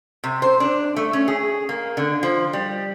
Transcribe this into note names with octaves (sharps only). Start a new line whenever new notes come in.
C3
C5
D4
A3
C#4
G#4
A#3
D3
F3
G3